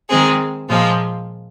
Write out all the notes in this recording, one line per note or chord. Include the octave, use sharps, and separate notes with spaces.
D#3 G#3 C4 G#4
A#2 F3 G#3 F4